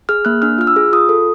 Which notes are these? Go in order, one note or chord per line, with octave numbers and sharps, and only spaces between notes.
G#4 F6
A#3 F#6
D4 F6
F4 F6
E6
G#4
F4 D#6
A4